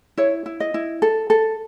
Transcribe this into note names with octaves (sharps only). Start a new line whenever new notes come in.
E4 C#5
E4
D#5
E4
A4
A4